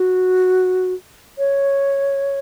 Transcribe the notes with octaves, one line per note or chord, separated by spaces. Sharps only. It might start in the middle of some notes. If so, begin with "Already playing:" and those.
Already playing: F#4
C#5